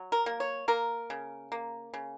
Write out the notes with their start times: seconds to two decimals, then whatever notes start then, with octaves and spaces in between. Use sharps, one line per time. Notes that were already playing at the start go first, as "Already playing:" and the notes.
Already playing: F#3
0.12 A#4
0.26 A#3
0.40 C#5
0.68 A#3 A#4
1.10 C#3
1.52 A#3
1.94 C#3